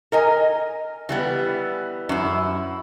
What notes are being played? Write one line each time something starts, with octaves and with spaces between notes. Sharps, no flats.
A#4 D#5 G#5
E3 G3 B3
F#2 E4